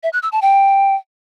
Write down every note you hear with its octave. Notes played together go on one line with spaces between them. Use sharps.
E5
F#6
E6
A5
G5